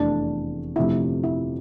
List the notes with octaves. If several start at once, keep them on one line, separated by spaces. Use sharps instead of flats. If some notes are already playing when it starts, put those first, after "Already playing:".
Already playing: F1 E2 C3 E3 A3 D4
G1 F2 C3 F3 A3 E4
E4